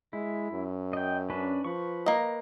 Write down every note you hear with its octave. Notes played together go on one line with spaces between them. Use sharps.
G#3 E4
F#2
D#5 G5
C#4 D4 B4
F3 B4 C#6
A#3 D#5